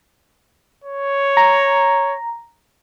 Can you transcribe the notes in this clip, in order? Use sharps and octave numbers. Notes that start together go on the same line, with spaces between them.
C#5
A#5